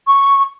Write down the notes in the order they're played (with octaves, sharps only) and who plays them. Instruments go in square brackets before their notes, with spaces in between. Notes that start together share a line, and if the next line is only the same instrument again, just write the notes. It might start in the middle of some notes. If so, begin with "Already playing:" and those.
[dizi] C#6